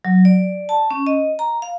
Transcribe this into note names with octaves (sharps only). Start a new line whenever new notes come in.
F#3
D5
A5
C#4
D#5
A#5
F5